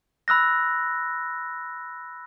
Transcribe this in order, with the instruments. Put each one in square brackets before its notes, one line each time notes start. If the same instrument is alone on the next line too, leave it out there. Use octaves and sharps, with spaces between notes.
[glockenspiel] B5 E6 F#6 A#6